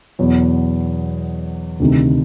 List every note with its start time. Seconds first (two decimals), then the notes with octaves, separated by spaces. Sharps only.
0.19 E2 B2 F#3
1.80 D2 C3 D#3